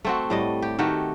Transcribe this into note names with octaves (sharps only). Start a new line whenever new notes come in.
A3 C4 F#4
A2 G3 D#5
G4
D#3 A3 F#4 G4